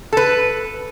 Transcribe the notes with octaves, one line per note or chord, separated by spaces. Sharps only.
A4 B4